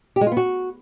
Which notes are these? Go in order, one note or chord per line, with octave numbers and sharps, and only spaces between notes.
G4
G#3
F4
B3
F#4